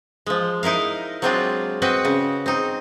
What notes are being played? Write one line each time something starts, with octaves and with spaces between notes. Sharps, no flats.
F3 G#3
D#4 E4 A#4 F5
F#3 G#3 C4 D4 F4
C4 F#4 B4 D#5
C#3
C4 D#4